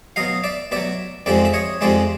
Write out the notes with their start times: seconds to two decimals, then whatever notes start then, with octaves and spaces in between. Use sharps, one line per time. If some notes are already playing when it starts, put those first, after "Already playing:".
0.16 B2 F#3 D#5 F5
0.44 D5 E5
0.72 B2 F#3 D5 E5
1.26 F2 C3 F3 G#3 D5 E5
1.45 E5
1.54 C#5 D#5
1.81 F2 C3 F3 G#3 D5 E5